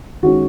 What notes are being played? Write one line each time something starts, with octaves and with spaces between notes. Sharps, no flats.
D#3 G#3 C#4 F#4